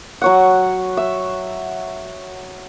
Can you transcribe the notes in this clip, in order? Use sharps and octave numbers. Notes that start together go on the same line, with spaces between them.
F#3 C#5 F#5
E5